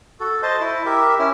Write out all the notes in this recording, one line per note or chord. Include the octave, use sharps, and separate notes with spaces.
F#4 A4
C5 D#5 A5
E4
G4 A#4 E5
C#4 E4